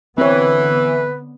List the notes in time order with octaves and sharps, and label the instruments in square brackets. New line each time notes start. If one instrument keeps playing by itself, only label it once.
[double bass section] D3 B3 [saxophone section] E3 [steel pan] C4 C#5 [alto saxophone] B4